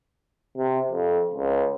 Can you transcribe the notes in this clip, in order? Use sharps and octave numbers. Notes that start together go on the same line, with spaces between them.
C3
F2
C#2